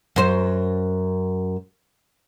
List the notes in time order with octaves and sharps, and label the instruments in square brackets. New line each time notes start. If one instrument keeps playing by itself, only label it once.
[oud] F#2 C5